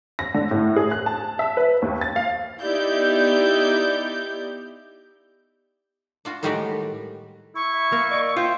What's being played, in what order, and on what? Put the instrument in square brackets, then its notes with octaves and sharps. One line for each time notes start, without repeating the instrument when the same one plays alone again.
[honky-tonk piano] A#6
D3
A2
G#4
F#6
A5
E5
B4
D#2
A6
F5
[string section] B3 D#4 E4 G4 D5 G6
[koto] D4 F4 F#4
A2 D#3 G3 G#3 F#4 D5
[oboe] E4 [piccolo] C#6
[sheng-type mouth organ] E5
[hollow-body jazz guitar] A#3
[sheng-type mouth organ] D5 D#5
[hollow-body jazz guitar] F4 [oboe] C5 [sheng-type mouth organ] E5 G5